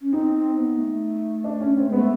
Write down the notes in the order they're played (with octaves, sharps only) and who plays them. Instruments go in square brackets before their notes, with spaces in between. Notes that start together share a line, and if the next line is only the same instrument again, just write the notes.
[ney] C#4
[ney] C4 [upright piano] D#4
[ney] C4
B3
A3
[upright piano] D4
C#4
C4
[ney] G#3 [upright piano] B3
[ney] A3